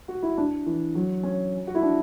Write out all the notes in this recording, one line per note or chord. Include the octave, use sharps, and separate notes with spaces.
F#4
E4
D4
E3
F#3
C#4
F#4
E4
D4